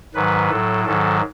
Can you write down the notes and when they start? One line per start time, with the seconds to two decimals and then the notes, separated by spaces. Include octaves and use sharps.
0.14 G#2 D#3 F#3 B4
0.50 A2 F#3 A4
0.85 G#2 D#3 F#3 A4